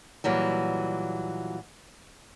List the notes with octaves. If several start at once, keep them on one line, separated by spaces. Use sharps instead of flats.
A#2 E3 F#3 G3